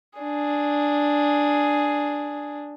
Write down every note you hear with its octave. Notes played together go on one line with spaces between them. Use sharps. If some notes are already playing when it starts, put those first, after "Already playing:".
D4 G#4